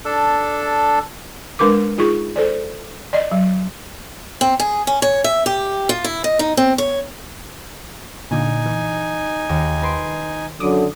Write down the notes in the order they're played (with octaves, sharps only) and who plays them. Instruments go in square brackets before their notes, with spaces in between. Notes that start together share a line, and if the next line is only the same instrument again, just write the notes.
[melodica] D4 A4
[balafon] G#3 D4 A#4 B4 D6
D#4 F4 G#4 C#6
A4 C5 D5
D5 D#5
F#3
[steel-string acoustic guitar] C4
G#4
C#4
C#5
E5
G4
F4
E4
D#5
D#4
C4
C#5
[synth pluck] A#2 D3 [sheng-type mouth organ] D#4 G#5
[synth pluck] E3
[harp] D#2
B4 C6 D7
[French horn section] F#2 D3 [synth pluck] D6 D#6